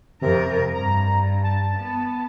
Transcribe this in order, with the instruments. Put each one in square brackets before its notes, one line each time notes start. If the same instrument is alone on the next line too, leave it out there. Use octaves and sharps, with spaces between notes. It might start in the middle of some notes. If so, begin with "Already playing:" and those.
[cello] F2 A#4 [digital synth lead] C3
[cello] G2 [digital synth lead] A#5
[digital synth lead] A5
[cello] B3